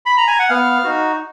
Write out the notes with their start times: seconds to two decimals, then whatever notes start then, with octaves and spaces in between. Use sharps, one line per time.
0.06 B5
0.17 A#5
0.28 G#5
0.39 F#5
0.49 B3 F5
0.84 D#4 F#4